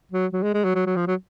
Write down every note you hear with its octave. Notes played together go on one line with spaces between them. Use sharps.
F#3
F#3
G#3
G#3
F#3
F#3
F#3
F3
F#3